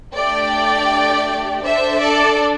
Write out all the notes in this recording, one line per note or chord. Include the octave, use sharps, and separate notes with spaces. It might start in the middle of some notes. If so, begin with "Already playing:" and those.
A3 D4 G4 D5 G5
D4 A4 C5 E5
A4 D5